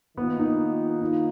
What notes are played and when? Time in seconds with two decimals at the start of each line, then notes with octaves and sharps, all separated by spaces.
0.17 D#3 A#3 B3 F4
0.39 D#4
1.01 D#4